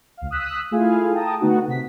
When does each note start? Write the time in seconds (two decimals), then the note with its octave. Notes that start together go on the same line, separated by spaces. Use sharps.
0.17 C#2 F5
0.31 D#6 E6 F#6 B6
0.71 A3 E4 F4 G#4 F5 G#5
1.13 G5 A5 A#5 D#6
1.40 D3 A3 B3 D#4 F#4
1.68 C3 B6